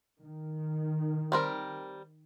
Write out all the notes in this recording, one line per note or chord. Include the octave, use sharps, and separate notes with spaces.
D#3
G3 C4 A#4